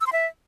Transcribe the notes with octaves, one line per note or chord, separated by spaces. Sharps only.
E6
C6
E5